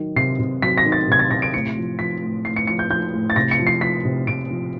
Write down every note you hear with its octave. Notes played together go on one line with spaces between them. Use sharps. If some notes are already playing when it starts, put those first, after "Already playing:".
Already playing: D#3 F#3
C3 C7
C3
F#3 B6
A#6
D#3
A6
C3 G#6
A6
C3 A#6
D7
A2 C#7
F3
F3 B6
A2
A2 C7
C#7
F3 C#7
G6
F3 G6
A2
A6
C3 A#6
C#7
F3
C7
F3 B6
C3
C3 D7
F3